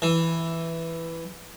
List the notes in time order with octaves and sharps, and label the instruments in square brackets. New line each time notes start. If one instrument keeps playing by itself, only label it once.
[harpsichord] E3